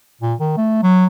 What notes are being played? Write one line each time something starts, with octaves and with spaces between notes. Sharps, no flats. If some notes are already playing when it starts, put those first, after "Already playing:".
A#2
D#3
A3
F#3